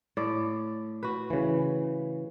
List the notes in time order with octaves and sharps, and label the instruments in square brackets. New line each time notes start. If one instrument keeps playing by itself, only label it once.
[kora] A2 D5
F#4 B4
[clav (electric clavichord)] C#3 E3